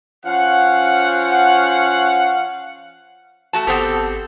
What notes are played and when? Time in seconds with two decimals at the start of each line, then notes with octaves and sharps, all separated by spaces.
0.25 F3 C#4 F5 F#5
3.53 A3 F#4 A5
3.67 G1 B3 C4 G4 A4